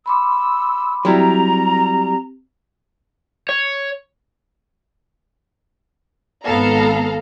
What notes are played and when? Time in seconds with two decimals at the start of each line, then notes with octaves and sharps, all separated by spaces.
0.06 B5 C6 D6 E6
1.05 F#3 G3 C4 E4 G4 A#5
3.49 C#5
6.44 G#1 B3 A4 F5 A#5